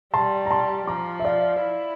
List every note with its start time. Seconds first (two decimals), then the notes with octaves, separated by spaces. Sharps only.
0.14 G3 A5 C6
0.46 A#5
0.51 A5 C6
0.87 F3 A#5 D6
1.20 E5
1.25 D5 F5
1.62 E4